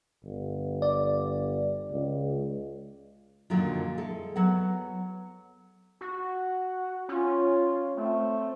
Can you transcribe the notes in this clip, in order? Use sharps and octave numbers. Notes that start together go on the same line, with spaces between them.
G1
D5
C#2
F#2 A#2 D3 D#3 F3 F#3
G#3 E4 A4
F#3 B3 F#5
F#4
C#4 F4
A3 C4